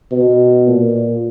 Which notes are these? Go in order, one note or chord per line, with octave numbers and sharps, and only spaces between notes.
B2
A#2